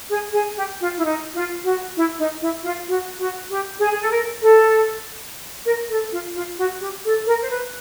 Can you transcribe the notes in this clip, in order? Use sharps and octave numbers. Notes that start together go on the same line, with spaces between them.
G#4
G#4
G4
F4
E4
D#4
F4
F#4
E4
D#4
E4
F4
F#4
F#4
G4
G#4
G#4
A4
A#4
A4
A#4
A4
F4
F4
F#4
G4
A4
A#4
C5
B4